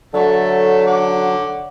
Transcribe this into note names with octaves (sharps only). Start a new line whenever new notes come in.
D3 F#3 A3 A4 C#5 E5
F#5 D6